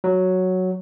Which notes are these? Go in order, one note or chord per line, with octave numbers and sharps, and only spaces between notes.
F#3